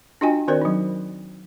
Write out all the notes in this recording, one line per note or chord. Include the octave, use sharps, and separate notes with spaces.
D4 F4 F#4 D#5 G5 G#5
D#3 C4 F#4 A#4 C5 D5
F#3 D#4